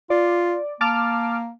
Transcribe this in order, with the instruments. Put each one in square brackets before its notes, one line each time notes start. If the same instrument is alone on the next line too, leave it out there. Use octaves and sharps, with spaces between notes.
[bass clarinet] F4 [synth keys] D5
[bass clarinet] A#3 [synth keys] A5 D6 F6